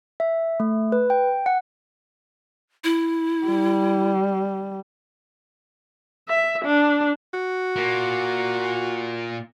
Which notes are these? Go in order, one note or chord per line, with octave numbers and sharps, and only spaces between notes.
E5
A3
B4
G5
F#5
E4
G3
E5
D4
F#4
A#2 A#3